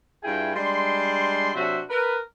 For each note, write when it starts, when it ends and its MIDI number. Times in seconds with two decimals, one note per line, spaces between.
0.24 0.55 43
0.24 0.55 64
0.24 0.55 65
0.24 0.55 68
0.24 0.55 76
0.24 0.55 79
0.56 1.51 55
0.56 1.51 56
0.56 1.51 62
0.56 1.51 84
1.55 1.81 48
1.55 1.81 54
1.55 1.81 62
1.55 1.81 66
1.55 1.81 72
1.55 1.81 76
1.90 2.18 70
1.90 2.18 71